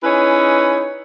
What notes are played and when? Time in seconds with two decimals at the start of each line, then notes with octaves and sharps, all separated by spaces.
0.03 C#4 D#4 E4 G#4 B4 C#5